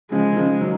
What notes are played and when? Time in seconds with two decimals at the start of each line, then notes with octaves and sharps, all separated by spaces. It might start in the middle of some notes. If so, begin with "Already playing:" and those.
0.12 C#3 F3 G#3
0.32 D#3
0.37 C#3 F3
0.61 D#3 F#3